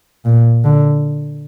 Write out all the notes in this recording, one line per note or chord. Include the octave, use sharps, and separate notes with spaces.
A#2
D3